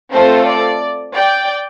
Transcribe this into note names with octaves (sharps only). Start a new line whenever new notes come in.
A3 C4 F4 A4 C5
D5
D5 G5